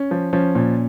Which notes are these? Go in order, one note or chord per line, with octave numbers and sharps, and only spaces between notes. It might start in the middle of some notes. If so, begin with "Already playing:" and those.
Already playing: C#4
F3
F3 C#4
A#2